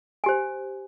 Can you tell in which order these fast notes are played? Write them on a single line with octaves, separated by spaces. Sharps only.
G#5 G4 C5